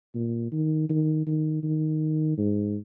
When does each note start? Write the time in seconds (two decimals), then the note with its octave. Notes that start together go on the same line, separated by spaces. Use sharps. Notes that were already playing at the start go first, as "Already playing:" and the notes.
0.15 A#2
0.52 D#3
0.90 D#3
1.27 D#3
1.63 D#3
2.38 G#2